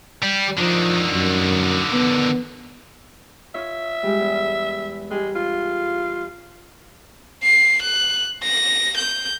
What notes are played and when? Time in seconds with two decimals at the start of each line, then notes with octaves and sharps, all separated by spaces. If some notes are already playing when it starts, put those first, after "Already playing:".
0.23 G3
0.58 D3 D#3 F3
1.12 F#2
1.93 B3
3.54 F4 C#5 E5
4.03 G3 G#3 G4
4.19 E2
5.11 G3 G#3 G4 G#4
5.36 F4
7.43 C7
7.82 F#6
8.43 A#6
8.97 G6